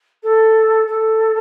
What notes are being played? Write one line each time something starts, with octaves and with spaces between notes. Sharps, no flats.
A4
A4